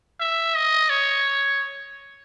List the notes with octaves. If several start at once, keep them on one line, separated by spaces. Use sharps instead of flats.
E5
D#5
C#5